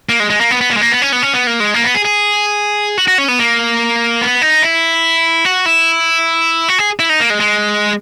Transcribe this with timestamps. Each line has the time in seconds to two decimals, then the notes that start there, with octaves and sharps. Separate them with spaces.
0.09 A#3
0.20 G#3
0.30 G#3
0.41 A#3
0.51 B3
0.61 B3
0.71 A#3
0.77 G#3
0.81 A#3
0.92 B3
1.02 C#4
1.13 B3
1.23 C#4
1.33 B3
1.47 A#3
1.60 G#3
1.74 A#3
1.84 B3
1.95 G#4
2.05 G#4
2.98 F#4
3.08 F#4
3.18 C#4
3.28 B3
3.39 A#3
4.21 B3
4.42 D#4
4.62 E4
5.45 F#4
5.66 E4
6.69 F#4
6.79 G#4
6.99 E4
7.09 D#4
7.20 A#3
7.30 G#3
7.40 G#3